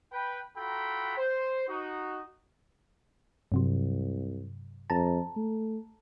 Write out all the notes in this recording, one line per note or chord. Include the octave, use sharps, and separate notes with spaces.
B4 G5 B5
F4 F#4 A4 G5 A#5 B5
C5
D#4 F#4
C2 G2 C3 F#3
F2 A5 A#5
A3